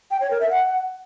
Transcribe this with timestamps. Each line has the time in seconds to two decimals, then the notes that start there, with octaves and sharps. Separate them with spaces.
0.11 G5
0.21 C#5
0.30 A#4
0.40 E5
0.50 F#5